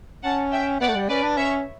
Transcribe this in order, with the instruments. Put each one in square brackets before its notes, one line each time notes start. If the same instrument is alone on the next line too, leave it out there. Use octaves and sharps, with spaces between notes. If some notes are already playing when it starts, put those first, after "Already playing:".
[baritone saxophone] C#4 [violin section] F#5 A5
[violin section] E5 G5
[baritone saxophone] B3 [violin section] D5 F#5
[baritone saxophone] A3
G3
[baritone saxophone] C#4 [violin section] B4 D5
[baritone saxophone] D4
[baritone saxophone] C#4 [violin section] C#5 E5